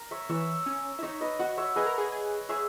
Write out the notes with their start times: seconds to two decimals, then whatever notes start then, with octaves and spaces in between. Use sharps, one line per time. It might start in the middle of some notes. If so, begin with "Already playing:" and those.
Already playing: A#4
0.11 C#5 E5
0.29 E3 C#5 E5
0.66 C#4
0.99 E4
1.02 D#4 C#5 E5
1.21 B4 D#5
1.39 F#4 D#5 F#5
1.57 C#5 E5
1.76 G#4 B4 D#5
1.86 A#4
1.98 G#4
2.12 G#4
2.49 G#4 C#5 E5